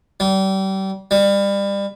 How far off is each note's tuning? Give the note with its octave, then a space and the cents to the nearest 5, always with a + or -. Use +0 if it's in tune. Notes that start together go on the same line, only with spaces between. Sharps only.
G3 -30
G3 +30